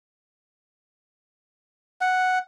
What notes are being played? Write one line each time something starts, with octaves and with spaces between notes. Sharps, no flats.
F#5